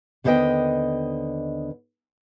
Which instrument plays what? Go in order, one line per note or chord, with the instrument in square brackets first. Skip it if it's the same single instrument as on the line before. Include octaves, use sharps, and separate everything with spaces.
[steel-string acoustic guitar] D#2 D3 B3 C5 D#5 G5